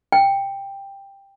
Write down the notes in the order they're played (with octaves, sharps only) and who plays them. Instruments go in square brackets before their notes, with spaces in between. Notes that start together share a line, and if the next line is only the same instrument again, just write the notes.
[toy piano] G5